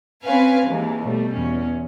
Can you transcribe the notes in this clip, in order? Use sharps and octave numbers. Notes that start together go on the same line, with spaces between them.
C4 C#4 B4 F5 G#5
D#2 E3 G#3 A#3
B2 G3 A3
E2 C#4